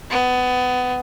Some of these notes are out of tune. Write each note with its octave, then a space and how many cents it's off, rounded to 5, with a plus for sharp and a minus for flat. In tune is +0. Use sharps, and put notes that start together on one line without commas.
B3 +20